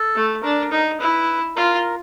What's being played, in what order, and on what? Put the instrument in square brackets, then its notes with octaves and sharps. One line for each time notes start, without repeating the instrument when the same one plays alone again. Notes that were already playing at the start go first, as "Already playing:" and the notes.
Already playing: [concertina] A4
[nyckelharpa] A3
[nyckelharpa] D4 [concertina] A#4
[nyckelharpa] D#4
[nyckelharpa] E4 [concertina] B4
[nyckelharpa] F4 [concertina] A#4